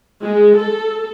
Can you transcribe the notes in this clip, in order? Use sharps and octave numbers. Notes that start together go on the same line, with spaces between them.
G#3
A4